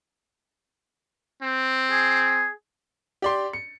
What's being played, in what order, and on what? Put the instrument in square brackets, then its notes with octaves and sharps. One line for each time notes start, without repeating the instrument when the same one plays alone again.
[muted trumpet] C4
[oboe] G#4
[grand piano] G4 D5 C6
C#7